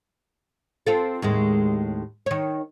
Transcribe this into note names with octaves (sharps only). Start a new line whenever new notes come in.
C4 F4 A4
D#2 A2 G#3
D#3 C#5